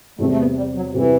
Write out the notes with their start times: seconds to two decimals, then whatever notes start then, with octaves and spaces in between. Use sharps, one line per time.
0.19 E2 C3 G3 A3 C4 G4
0.31 A3
0.38 B3
0.56 G3
0.76 F#3
0.94 C3 E3 G3 C4 G4